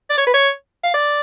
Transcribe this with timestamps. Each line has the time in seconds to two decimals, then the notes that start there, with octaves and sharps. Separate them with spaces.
0.10 D5
0.18 C#5
0.27 B4
0.34 C#5
0.84 F5
0.94 D5